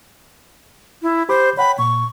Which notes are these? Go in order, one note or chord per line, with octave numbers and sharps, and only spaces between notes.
E4
G4 C5 B5 D6
C#5 F#5 G5 B5
A#2 C#6